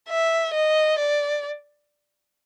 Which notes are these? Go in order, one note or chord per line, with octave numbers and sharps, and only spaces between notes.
E5
D#5
D5